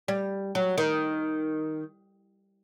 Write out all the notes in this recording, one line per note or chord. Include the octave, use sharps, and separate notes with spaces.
G3
F#3
D#3